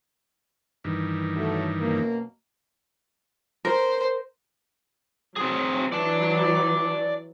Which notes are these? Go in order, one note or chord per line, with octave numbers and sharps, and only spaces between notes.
G2 D#3 E3
F#3 A3
F#2 B2 A#3
A#4 C5
F#3 C4 G#4
E3 F#3 D5 A5